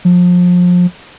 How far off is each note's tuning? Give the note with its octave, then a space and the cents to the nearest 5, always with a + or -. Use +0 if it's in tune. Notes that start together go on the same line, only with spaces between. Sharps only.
F3 +30